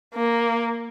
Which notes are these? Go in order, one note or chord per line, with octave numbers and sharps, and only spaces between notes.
A#3